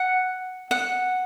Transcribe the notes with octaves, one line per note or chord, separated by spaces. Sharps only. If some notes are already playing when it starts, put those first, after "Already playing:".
Already playing: F#5
F#5